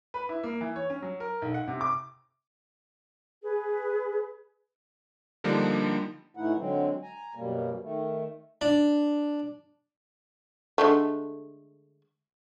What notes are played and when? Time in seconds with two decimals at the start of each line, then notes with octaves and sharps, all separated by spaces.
0.14 B4
0.29 E4
0.44 A#3
0.61 E3
0.76 C#5
0.90 C#4
1.02 F#3
1.20 A#4
1.42 B1
1.54 F#5
1.68 C3
1.81 D6
3.42 G#4 B4
5.44 D3 F3 G3 A#3 D4 D#4
6.37 A2 E3 A3 D#4 E4 F#5
6.57 D3 F#3 G#3 C4
7.02 G#5 A#5
7.35 F#2 B2 G3 A#3
7.81 D#3 A3
8.61 D4
10.78 D3 G#3 A3